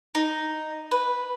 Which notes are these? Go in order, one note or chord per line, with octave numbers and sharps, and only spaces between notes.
D#4
B4